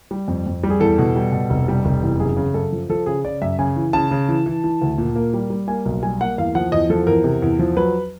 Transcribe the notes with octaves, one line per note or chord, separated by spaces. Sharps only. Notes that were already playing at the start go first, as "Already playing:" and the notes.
G3
F2
F2
G3
G#4
E2 A4
B2
G3
B2
F1
G3
F1
E2
F#2 G#4
C#3
F#2 A4
F3
F3 A4
C#3 G#4
C#3 D5
F#2 E5
C#3 G#5
E3
C#3 A5
C#3
E3
E3
E3
D2
A#2
A#3
G3
G3
A#3 G#5
B1
G3 G#5
A#3 F#5
E2 F5
F3 F#5
E2 D#5
F3 A4
E2 A#4
C3
E2
F3
F#3 B4